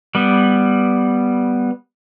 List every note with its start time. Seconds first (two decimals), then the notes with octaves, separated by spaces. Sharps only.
0.15 G3 B3